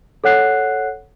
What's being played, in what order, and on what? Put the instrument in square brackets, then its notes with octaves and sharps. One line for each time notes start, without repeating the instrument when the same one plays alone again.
[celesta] A4 C#5 F#5 F#6 C7